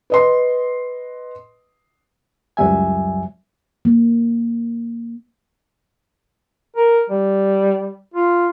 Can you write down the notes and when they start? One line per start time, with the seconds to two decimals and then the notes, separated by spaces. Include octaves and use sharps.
0.10 B4 D#5 C6
2.57 C#2 F#2 F#3 G3 E5 G#5
3.85 A#3
6.76 A#4
7.09 G3
8.14 F4